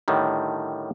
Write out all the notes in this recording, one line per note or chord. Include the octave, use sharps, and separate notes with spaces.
A2 D3 D#3 G3